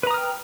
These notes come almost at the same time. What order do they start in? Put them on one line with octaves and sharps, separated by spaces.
B4 A#5 D#6 F6 G5